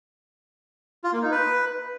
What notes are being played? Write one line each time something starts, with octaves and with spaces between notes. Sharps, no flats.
F4
A#3
D#4
B4